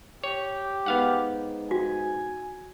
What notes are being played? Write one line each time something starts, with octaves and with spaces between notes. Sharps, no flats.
G4 C#5
G#2 B3 F5 F#5
F#4 G#5